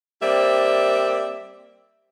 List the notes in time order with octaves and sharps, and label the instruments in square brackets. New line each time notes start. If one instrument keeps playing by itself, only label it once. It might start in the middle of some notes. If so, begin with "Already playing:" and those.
[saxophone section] G3 A#3 C4 D5 E5